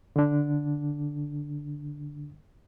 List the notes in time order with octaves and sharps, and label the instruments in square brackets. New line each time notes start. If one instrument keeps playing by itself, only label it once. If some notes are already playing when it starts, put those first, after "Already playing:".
[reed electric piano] D3 D4